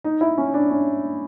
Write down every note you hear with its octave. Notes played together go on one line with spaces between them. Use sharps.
D#4
E4
C#4
D4
C#4